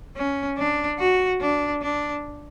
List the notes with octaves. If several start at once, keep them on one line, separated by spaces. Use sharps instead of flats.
C#4
D4
F#4
D4
D4